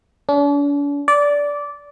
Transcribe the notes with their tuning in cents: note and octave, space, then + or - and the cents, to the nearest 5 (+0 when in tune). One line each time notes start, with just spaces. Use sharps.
D4 -45
D5 -15